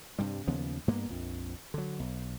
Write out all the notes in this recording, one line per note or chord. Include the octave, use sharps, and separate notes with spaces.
G2 C3 G3
D#2 C#3 F3 B3
G2 A#3 B3
A#1 F2
D3 F#3
B1